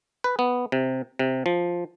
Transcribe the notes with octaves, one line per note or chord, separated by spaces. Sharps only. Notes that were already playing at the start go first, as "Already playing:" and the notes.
B4
B3
C3
C3
F3